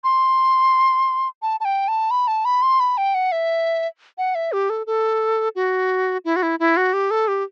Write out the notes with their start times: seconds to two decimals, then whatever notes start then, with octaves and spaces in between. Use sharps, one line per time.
0.04 C6
1.42 A5
1.60 A5
1.65 G5
1.88 A5
2.11 B5
2.28 A5
2.45 B5
2.62 C6
2.80 B5
2.98 G5
3.15 F#5
3.32 E5
4.18 F#5
4.35 E5
4.52 G4
4.70 A4
4.87 A4
5.55 F#4
6.25 E4
6.36 F#4
6.43 E4
6.60 E4
6.77 F#4
6.93 G4
7.11 A4
7.28 G4